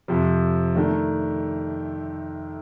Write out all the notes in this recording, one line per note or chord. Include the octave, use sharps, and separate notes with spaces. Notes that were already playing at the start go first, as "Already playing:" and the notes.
F2 C3 F3
D#3 A3 D4